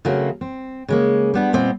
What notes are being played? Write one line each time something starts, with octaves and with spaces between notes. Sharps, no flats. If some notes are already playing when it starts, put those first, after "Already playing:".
C#3 F#3 A3 A#3 C4
C4
C#3 G#3 A#3
G3 B3 D4
A#2 B3 C4 D#5